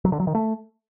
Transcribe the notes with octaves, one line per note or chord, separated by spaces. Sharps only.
F#3
D3
F#3
D#3
A3